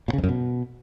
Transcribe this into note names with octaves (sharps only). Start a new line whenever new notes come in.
A#2
C#3
F2
F#2
B2